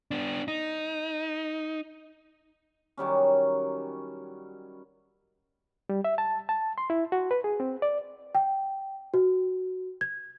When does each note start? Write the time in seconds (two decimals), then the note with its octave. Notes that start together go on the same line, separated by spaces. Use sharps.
0.11 B3 D4
0.48 D#4
2.97 D#3 F#3 G3 C#4
5.89 G3
6.04 E5
6.18 A5
6.49 A5
6.78 C6
6.90 E4
7.12 F#4
7.31 B4
7.44 G#4
7.60 C4
7.82 D5
8.35 G5
9.14 F#4
10.01 G#6